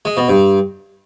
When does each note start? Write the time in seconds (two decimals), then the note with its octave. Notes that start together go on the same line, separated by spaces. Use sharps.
0.05 G#3
0.17 B2
0.29 G2